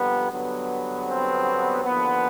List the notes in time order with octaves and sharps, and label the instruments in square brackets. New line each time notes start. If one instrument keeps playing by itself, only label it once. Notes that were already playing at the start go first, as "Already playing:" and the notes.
Already playing: [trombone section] F2 D3 G3 A#3 B3
G2 D3 F#3 B3
C4
D#2 D3 F3 A#3 B3